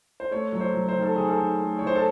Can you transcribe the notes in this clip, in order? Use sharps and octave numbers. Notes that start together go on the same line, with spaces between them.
C5
A3 C#5
F#3 C#5
C5
F#3
C5
D#3
A4
D#3 G#4
A4
D#3
A3
C#5
D#3 C5
A4